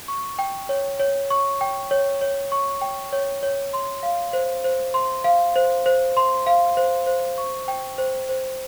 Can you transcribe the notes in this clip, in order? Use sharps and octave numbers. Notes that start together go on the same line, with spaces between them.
C#6
G5
C#5
C#5
C#6
G5
C#5
C#5
C#6
G5
C#5
C#5
C6
F5
C5
C5
C6
F5
C5
C5
C6
F5
C5
C5
C#6
G5
C5
C5